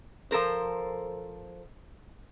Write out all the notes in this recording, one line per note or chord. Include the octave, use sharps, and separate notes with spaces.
F3 A4 A#4 C5